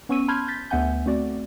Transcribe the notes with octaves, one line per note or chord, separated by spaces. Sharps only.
B3 C#4 C#6 E6 D#7
A5 B5 C6 F6 G6 G#6
G6 A6 B6
D2 B3 E5 F#5 G#5 G6
A3 C4 F#4 D5